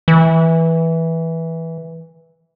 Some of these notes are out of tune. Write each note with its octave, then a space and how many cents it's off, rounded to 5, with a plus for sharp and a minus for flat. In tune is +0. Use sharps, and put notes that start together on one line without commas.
E3 -10